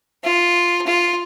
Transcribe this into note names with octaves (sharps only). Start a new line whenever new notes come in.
F4
F4